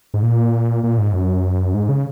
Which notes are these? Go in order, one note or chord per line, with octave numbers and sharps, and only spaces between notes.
G#2
A#2
A#2
G#2
F#2
G#2
C#3